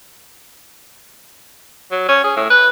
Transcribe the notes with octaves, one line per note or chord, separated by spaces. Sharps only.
F#3
C#4
G#4
A2
B4